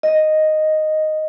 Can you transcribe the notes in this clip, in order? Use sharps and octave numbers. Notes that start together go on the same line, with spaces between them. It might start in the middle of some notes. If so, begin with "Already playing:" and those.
D#5